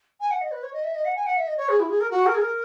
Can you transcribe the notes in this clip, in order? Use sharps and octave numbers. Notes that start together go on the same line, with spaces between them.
G#5
F#5
D#5
B4
C#5
D#5
E5
D#5
F#5
G#5
F#5
E5
D#5
C#5
G#4
E4
G#4
A#4
F#4
A#4
G#4
A#4